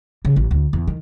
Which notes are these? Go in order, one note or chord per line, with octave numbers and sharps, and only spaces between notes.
C#3
A1
D2
E2
D#3